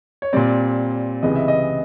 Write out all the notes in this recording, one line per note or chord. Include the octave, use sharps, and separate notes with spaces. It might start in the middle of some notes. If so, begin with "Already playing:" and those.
C#5
A#2 G3 C4 D5
C#2 C3 E3 G#3 B3 D#5
E5
D#5